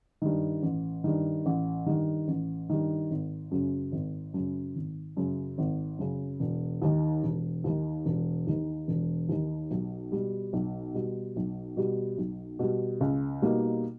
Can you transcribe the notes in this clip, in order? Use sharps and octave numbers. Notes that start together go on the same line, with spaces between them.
G2 D#3
A1
G2 D#3
A1
G2 D#3
A1
G2 D#3
G#1
F#2 C#3
G#1
F#2 C#3
G#1
F#2 C#3
G#1
F#2 C#3
E1
D#2 D#3
E1
D#2 D#3
E1
D#2 D#3
E1
D#2 D#3
B1
B2 G3
B1
B2 G3
B1
B2 G3
B1
B2 G3
C#2
B2 G3 A#3 D#4